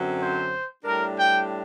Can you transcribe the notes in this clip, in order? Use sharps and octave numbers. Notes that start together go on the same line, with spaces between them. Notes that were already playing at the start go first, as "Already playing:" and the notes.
Already playing: F#2 D3 F#3 C4
C5
A2 G3 D4 A#4
G5